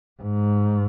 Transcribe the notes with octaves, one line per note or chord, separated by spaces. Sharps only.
G#2